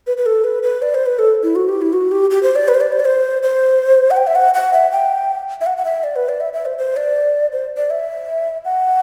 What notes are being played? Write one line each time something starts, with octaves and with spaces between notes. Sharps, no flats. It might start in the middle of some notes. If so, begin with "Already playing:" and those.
B4
B4
A4
B4
B4
D5
C5
B4
A4
E4
F#4
G4
E4
F#4
G4
G4
C5
D5
B4
C5
D5
C5
D5
C5
C5
F#5
G5
E5
F#5
F#5
E5
G5
E5
F#5
F#5
E5
D5
B4
D5
E5
E5
C5
C5
D5
C5
D5
E5
F#5